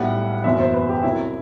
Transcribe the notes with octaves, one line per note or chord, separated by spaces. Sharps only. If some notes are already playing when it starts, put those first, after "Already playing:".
Already playing: B1 A2 G3 F#5
F#1 E2 B2 F#3 E5
C5
B4
G4
C2 C3 F#3 E4